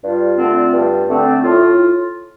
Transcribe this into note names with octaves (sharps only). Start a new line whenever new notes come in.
G2 F4
D3 A3 C4
G2
D3 A3 C4
A2 F4